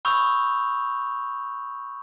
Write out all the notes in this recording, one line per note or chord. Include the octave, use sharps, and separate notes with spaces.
B5 C#6 D#6 E6 G6 F7